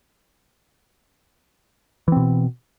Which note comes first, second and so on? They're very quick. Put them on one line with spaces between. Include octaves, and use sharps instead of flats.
E3 C4 B2